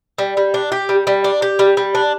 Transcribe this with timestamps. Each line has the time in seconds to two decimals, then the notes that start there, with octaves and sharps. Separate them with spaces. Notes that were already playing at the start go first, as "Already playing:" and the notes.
0.18 G3
0.37 G3
0.54 D4
0.72 G4
0.89 G3
1.07 G3
1.24 D4
1.42 G4
1.59 G3
1.77 G3
1.95 D4